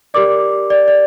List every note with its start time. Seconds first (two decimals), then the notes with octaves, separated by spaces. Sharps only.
0.14 G4 A#4 D5 D6
0.70 D5
0.88 D5